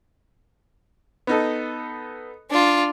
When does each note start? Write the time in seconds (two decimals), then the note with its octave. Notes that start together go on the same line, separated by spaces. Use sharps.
1.27 B3 D#4 A4
2.50 D4 F4